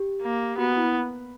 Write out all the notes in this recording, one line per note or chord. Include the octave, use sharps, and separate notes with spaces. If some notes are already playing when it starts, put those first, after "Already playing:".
Already playing: G4
A#3
B3 F#4
E4